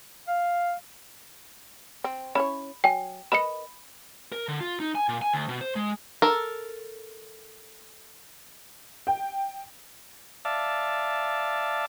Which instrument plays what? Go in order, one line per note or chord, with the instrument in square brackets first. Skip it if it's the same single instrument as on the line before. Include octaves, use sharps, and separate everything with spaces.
[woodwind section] F5
[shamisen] C4
[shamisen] C#4 E4 C#5 [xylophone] B5
[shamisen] F#3 G#5 [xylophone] G5
[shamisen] A#4 B4 D#5 [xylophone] B5 C#7
[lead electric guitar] A#4
D3
F4
D#4
G#5
A#2
G#5
D2
B2
C5
G#3
[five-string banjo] A4 A#4
[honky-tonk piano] G5
[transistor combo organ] D5 E5 F5 A5